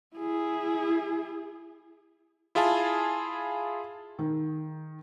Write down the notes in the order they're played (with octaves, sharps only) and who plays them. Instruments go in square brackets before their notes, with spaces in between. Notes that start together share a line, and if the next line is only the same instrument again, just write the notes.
[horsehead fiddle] E4 G#4
[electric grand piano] E4 F4 G#4 F5 G#5 A5
[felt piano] D#3